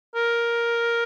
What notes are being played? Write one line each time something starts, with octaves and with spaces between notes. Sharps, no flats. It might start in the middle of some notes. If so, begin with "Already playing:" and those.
A#4